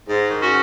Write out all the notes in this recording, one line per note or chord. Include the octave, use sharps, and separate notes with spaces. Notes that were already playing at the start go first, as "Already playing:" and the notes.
G#2
D#3
C#4 F#4